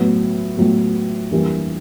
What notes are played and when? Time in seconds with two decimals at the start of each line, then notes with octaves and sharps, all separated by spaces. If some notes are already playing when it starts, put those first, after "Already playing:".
Already playing: A2 F#3 B3
0.57 A2 F#3 B3
1.32 E3 G3 A#3 D4 G4